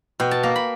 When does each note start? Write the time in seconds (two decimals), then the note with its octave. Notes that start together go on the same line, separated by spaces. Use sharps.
0.20 B2 G5
0.31 A5
0.43 A#3 A#5
0.56 B5